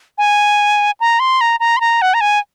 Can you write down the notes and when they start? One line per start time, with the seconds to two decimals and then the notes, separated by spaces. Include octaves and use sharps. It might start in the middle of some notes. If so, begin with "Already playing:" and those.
0.18 G#5
1.00 A#5
1.20 C6
1.41 A#5
1.60 A#5
1.77 C6
1.81 A#5
2.02 F#5
2.14 A#5
2.21 G#5